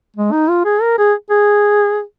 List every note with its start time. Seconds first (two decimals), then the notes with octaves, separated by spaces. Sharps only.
0.16 G#3
0.32 D#4
0.49 F4
0.65 G#4
0.82 A#4
0.98 G#4
1.30 G#4